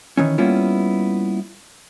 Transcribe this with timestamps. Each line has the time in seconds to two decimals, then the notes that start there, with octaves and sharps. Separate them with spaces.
0.17 D#3 E3 C#4
0.38 G3 A#3 B3 C#4 E4 F4